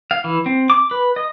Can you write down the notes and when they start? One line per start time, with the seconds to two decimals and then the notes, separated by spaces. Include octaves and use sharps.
0.11 F5
0.24 E3
0.46 C4
0.70 D6
0.91 B4
1.16 D#5